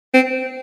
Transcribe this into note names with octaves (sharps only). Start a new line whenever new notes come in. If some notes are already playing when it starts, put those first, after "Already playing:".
C4